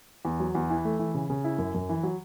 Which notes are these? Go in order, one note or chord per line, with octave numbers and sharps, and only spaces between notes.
E2
F#3
E2
E3
A3
E3
C#3
C#3
E4
F#2
F#2
E3
F#3